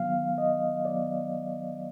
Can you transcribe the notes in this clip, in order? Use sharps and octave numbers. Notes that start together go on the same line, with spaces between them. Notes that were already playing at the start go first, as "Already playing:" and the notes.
Already playing: D#3 F#3 B3 F5
D#5
D#3 F#3 B3 D5